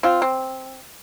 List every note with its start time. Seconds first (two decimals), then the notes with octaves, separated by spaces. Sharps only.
0.03 C4 F4
0.22 C4